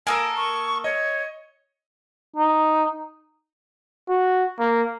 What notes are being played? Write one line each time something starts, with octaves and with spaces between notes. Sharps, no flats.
A#3 A4 A#4 G#5 A5 D#6 E6
C#6
C#5 D#5
D#4
F#4
A#3